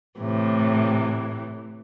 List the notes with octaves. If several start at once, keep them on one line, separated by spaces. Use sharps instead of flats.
A2 C3 E3